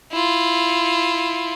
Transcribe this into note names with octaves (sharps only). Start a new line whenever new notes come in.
E4 F4